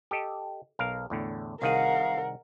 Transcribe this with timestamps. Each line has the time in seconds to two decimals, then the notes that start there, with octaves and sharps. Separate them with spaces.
0.11 G4 A4 D#5
0.79 B1 A#4 F5
1.10 E2 A2 D3
1.62 C2 D#3 G#4 A#4 F5 F#5